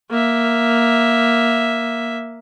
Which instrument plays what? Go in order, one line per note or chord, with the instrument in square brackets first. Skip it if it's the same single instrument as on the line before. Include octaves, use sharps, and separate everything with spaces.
[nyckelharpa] A#3 E5